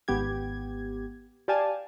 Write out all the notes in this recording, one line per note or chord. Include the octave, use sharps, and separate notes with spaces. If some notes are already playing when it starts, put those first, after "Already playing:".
G#1 B3 G4 G#6
G4 D5 F5 G#5 A5